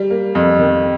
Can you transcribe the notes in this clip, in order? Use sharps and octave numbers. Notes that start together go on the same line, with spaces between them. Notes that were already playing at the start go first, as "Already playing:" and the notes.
Already playing: G3
A#3
F2
D#3